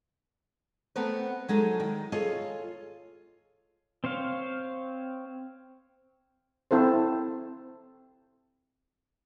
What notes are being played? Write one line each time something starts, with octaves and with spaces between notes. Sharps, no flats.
A3 B3 C4 A#4 B4
F#3 G#3 D#4 A4
D#3
F4 G#4 A4 C#5 D#5
C4 C5 C#5 F5
C4 E4 A4 C5